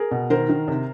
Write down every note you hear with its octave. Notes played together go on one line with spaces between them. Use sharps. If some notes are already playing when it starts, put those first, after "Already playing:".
Already playing: G#4 A#4
B2
D#3 A#4 C5
D#3
C3